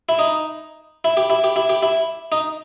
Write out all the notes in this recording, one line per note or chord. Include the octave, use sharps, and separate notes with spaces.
E4
D#4
E4
G4
E4
G4
E4
G4
E4
D#4